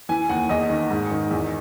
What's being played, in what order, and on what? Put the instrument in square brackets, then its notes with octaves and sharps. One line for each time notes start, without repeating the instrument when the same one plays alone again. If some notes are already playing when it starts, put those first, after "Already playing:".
[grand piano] E3 G#5
D#2 F#5
E2 D#5
D#3
G#2
D#3
E2